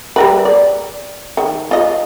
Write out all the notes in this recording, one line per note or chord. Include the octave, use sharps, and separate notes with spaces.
G3 A#4 B4
D5
D#3
F4 D#5